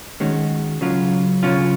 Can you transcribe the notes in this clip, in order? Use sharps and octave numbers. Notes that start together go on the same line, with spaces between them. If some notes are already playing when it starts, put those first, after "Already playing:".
D#3 G#3 C#4 F#4
C#3 F#3 C#4 F4
C#3 F#3 C#4 F4